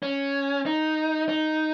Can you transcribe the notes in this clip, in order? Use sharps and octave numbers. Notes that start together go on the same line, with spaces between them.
C#4
D#4
D#4